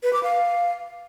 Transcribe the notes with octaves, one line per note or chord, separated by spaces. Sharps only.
B4
D6
F5